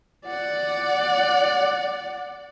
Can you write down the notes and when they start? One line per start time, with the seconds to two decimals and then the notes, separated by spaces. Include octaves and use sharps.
0.25 D5 F#5